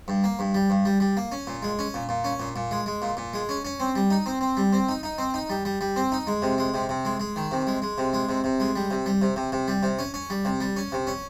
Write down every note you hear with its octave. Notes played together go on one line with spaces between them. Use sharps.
G2
A#3
G2
G3
G2
G3
G3
A#3
C#4
A#2
G#3
C#4
A#2
A#2
C#4
A#2
A#2
G#3
G#3
A#2
A#2
G#3
C#4
C#4
C4
G3
D#4
C4
C4
G3
C4
D#4
D#4
C4
D#4
G3
G3
G3
C4
D#4
G#3
C3
G#3
C3
C3
G#3
G#3
D#3
C3
G#3
G#3
C3
G#3
C3
C3
G#3
G3
C3
G3
C3
C3
C3
G3
C3
C#4
C#4
G3
C3
G3
C#4
C3
C#4